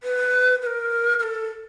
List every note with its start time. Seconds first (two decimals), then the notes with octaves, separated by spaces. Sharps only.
0.03 B4
0.62 B4
0.66 A#4
1.19 A#4
1.23 A4